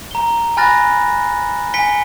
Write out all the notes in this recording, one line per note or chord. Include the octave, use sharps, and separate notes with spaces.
A#5 G7
G#5 B5 F6 F#6 A6 A#6
G#5 B6 C#7 G7